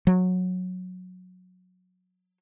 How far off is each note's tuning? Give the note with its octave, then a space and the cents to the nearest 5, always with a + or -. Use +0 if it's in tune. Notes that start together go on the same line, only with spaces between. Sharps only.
F#3 -15